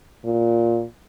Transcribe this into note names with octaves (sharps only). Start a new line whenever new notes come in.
A#2